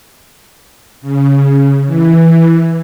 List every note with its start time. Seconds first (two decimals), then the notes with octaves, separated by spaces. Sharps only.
1.01 C#3
1.86 E3